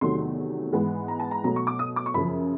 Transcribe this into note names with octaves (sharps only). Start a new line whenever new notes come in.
E2 C3 D#3 F#3 A3 C6
G#2 E3 G#3 B3
A#5
A5
A#5
B2 F#3 A3 A#5
C#6
D6
D#6
D6
C#6
F#2 C#3 F3 B5